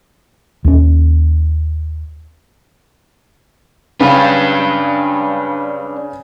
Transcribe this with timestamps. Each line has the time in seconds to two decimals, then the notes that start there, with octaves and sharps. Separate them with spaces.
0.65 D#2 C#4
4.01 C#3 D4 B4 F5